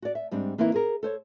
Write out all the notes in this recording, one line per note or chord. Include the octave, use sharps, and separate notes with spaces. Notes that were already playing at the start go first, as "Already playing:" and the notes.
F#4 D5
E5
G#2 G3 C4 D4
E3 A#3 C4 D#4 E4
G#4 A#4
A4 C5 C#5